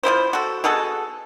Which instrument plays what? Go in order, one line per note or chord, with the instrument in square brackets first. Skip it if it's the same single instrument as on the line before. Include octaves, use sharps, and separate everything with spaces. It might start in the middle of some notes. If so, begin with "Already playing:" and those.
[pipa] F3 G#3 E4 C5
F#4 A4
B2 F#4 G#4 A4